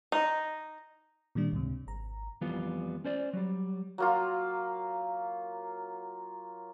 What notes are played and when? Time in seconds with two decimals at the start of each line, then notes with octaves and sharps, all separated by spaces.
0.12 D#4
1.35 A#2 D#3 G3 D4
1.52 C#2 G#2 C3
1.87 G#1 A#5
2.41 F2 E3 G3 B3 F4
3.04 C#4 C5 D5
3.33 F#3 G3
3.98 F#3 A#3 F4